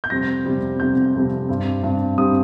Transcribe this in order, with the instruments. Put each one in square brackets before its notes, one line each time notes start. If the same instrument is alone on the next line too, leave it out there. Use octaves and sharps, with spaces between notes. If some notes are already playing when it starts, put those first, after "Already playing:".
[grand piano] G6
F2 C3 G3 C4 A#6
F2 C3 G3 C4
F2 C3 G3 C4 G6
F2 C3 G3 C4
G2 G3 C4
G2 G3 C4
G2 G3 C4 D#6